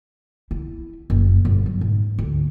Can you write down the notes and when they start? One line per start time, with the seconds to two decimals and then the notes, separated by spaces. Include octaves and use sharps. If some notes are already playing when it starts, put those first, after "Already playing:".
0.51 E4
1.10 F#1
1.45 G1
1.66 F#3
1.81 G#2
2.19 D2